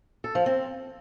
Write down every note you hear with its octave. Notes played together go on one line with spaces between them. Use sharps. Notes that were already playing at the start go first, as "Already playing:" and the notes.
A4
F3
C4